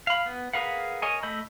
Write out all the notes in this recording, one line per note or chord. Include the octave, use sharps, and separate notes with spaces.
F5 B5
B3
G#4 A#4 B4 F5 F#5
A#4 C#5 D#5 G#5
A3 D#5 B5 E6 G6